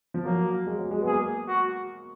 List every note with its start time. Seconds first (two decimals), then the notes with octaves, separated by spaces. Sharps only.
0.14 F3
0.25 F#3 A#3
0.67 G#3
0.78 F#3
0.91 G#3
1.02 B3
1.07 A#3 G#4
1.48 F#4